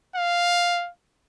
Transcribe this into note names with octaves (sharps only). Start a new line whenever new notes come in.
F5